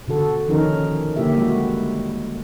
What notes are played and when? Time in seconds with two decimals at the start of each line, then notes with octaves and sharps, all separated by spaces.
0.07 B2 D3 F#4 A4
0.49 D#3 F3 C#4 D#4 A#4
1.16 D3 A#3 E4 G4 E5
1.36 G3 G#3 E4 F#4